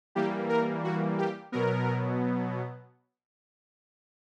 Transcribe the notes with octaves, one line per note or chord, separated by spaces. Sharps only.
E3 G3 A#3 G4
A#4
F#4
G4
B2 F#3 B3 A#4